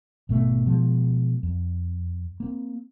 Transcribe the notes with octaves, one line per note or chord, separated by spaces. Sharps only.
G#1 B2 A3
B2 F3 G#3
F2
A#3 C4